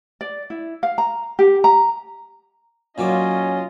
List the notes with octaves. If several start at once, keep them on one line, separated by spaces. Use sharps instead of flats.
D5
E4
F5
A#5
G4
A#5
A#2 F#3 C#4 F4 D#5 D6